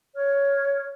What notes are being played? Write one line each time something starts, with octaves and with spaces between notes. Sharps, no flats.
C#5 F6